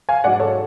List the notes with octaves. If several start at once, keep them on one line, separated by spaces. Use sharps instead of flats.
F5 G#5
G#2 F#3 D5 F#5
A4 C#5